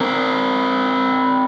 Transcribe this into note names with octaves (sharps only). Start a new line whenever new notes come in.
C4 A#4